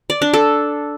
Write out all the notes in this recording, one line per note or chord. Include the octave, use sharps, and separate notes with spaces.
D5
D4
A4